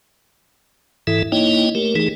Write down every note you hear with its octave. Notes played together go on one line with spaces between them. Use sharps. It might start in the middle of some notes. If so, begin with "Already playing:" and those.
G#2 E3 E4 A4 E5
A#3 D#4 E4 C#5 D#5 G5
A3 G4 A#4
E3 A3 D#4 G#4